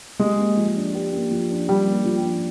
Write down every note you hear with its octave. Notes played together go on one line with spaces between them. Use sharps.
G#3 G4
A#3
F3
D4
G4
A#3
F3
D4
G3 G4
A#3
F3
D4